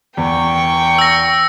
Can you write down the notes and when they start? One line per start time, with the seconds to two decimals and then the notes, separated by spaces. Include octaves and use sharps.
0.17 E2 G5 C#6
0.99 E6 A#6